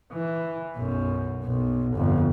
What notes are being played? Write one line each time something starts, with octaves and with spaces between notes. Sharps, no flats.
E3
B1 F#2
B1
G1 F2